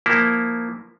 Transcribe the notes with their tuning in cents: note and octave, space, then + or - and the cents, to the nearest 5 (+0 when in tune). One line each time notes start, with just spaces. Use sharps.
F3 +0 A#3 +0 E4 +0